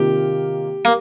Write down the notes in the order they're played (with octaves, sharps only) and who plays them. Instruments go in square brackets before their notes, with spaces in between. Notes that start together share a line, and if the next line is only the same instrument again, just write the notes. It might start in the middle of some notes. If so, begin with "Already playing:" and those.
Already playing: [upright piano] C3 D#3 A#3 F4 [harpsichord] G4
[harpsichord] A#3